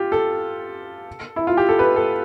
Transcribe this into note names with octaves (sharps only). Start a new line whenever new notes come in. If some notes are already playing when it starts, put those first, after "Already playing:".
Already playing: F4 G4
A4
E4
F4
G4
A4
B4
A4